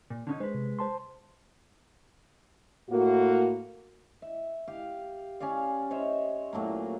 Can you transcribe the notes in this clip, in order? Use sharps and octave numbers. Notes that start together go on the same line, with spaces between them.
A#2
D3 C#4 D#4
G#3 B4 C5
C3
C5 A5 C6
A2 A#3 F#4
E5
G4 F5
C#4 C#5 D5 F5
C5 C#5 D#5 E5
A#2 F#3 A3 A#3